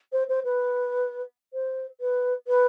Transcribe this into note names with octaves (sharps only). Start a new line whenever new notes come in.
C5
C5
B4
C5
B4
B4